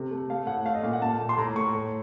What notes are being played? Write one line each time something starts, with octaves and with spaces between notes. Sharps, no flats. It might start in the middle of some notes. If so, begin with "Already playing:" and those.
Already playing: C3 A3
A3
A3 F5
A2 F#5
A3 F5
D#5
A#2 F5
F#5
A#2 A5
A3
C6
A2 A#5
A3 C#6
A2